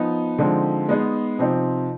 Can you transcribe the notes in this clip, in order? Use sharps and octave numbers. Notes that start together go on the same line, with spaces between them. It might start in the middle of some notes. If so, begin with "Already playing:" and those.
Already playing: F3 B3 D#4
D3 F3 G#3 C4 D#4
G#3 B3 D#4 G#4
C3 F3 C4 D#4